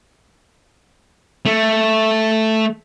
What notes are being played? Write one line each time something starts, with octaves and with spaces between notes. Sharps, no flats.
A3